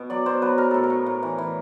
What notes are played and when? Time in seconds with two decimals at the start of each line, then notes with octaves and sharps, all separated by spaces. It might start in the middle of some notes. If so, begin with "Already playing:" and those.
Already playing: B2
0.10 F#3 D5
0.26 B2 C5
0.42 F#3 B4
0.58 B2 A#4
0.71 A2 A4
0.83 A#4
0.90 A2
1.06 A2
1.23 E3
1.38 E3